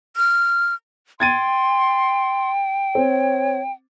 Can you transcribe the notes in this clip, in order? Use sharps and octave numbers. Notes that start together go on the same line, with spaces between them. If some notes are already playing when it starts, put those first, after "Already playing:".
F6
G5 C6 G#6 A6 D#7
C4 C#5